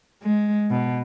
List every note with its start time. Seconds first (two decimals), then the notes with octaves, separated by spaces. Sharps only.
0.23 G#3
0.70 B2